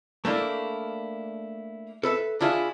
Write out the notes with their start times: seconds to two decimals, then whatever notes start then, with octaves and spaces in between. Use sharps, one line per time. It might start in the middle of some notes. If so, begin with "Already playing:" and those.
0.25 A3 A#3 D4 E4
2.03 A4 B4 E5
2.41 D4 E4 F4 G#4 E5